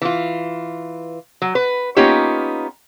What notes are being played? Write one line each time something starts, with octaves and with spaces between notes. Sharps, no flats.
E3 F4
F#3
B4
A#3 B3 C#4 D#4 F4 G4